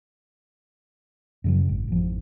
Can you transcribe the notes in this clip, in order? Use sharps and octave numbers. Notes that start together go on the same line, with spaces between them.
F#2 C#3 F#3
G#1
G#1 F2 F3